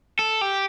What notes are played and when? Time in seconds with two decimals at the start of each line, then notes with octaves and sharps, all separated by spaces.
0.19 A4
0.41 G4